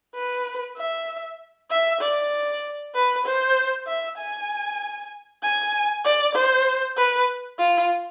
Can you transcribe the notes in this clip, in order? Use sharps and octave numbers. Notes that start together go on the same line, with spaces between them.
B4
E5
E5
D5
B4
C5
E5
G#5
G#5
D5
C5
B4
F4